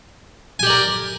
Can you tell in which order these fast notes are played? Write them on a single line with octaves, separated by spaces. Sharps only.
G#5 G4 D5 A#4